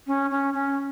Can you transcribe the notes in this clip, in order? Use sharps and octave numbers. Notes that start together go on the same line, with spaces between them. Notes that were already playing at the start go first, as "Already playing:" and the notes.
C#4
C#4
C#4